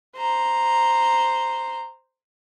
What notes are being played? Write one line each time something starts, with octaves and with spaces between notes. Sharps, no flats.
C5 A#5